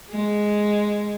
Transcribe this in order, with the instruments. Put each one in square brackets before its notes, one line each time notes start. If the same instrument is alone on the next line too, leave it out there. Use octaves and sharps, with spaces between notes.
[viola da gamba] G#3